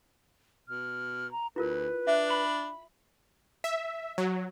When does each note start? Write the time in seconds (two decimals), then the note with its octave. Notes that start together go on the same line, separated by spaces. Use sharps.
0.68 B2 F6
1.32 A#5
1.56 D2 E4 F4 A#4 B4
2.07 D4 E5
2.30 B5
3.64 E5
4.18 F#3